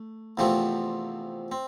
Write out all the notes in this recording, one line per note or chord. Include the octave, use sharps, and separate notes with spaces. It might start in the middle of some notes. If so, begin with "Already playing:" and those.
Already playing: A3
E2 C3 F3 A3 C4
C4